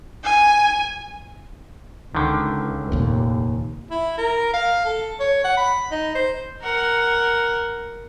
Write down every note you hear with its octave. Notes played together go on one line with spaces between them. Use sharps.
G#5
C#2 D3 D#3
F1 D#2 A#2
E4
A#4
F5
A4
C#5
F#5
B5
D#4
C5
A#4 F#5